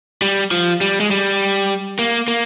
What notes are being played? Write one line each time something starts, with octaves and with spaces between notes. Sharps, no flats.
G3
F3
G3
G#3
G3
A#3
A#3